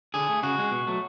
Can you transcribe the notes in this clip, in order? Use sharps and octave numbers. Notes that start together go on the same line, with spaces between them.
D3 G#4
A3
C#3 F#4
G#3
B2
F#3 A3